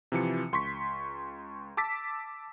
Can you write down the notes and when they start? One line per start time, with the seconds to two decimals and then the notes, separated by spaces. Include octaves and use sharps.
0.12 C3 E3 F3 C#7
0.52 C#2 C6 C#6 B6
1.77 A5 D6 E6 A6 B6